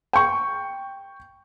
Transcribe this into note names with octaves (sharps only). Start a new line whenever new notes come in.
G5 C#6